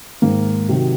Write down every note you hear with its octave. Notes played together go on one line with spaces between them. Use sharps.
G#2 D#3 A#3
C3 D#3 F#3